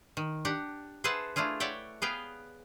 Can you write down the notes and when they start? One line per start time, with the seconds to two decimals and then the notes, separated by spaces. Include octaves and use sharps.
0.17 D#3
0.45 D4 G4 F#5
1.04 G#4 B4 C5 E5 F#5 A5
1.36 A3 D4 E4 F4 G#4
1.60 C#5 D5 E5 F#5 G5
2.02 B3 G#4 B4 F5 G5